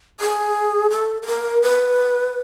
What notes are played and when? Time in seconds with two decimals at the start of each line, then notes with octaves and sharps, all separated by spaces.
0.20 G#4
0.90 A4
1.22 A4
1.27 A#4
1.62 B4